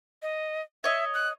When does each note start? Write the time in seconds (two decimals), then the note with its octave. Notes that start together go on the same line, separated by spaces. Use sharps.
0.22 D#5
0.84 C#5 D#5 E5
1.14 F#6